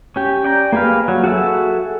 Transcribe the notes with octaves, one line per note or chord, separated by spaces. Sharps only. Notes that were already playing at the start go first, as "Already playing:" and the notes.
C#4 G4
D5 G5 A#5
A#3 G4 G#4 B4 F5
F#3
F#4 G#4 A4 E5